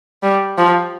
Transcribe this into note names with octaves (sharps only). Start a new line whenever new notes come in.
G3
F3